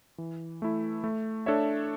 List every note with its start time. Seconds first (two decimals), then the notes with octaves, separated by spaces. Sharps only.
0.18 E3
0.62 A3 E4
1.04 A3
1.46 D4 A4 C#5 E5